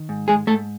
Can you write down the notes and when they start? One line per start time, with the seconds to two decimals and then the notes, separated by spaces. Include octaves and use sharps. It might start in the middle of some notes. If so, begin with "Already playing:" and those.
Already playing: D#3
0.09 G#2
0.28 G#3 G#4
0.47 G#2 A3 A4